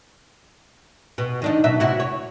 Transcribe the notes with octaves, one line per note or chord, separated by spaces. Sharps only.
B2
D#3 D4 D#4
B2 F#3 E5
C3 E4 F#4
C#5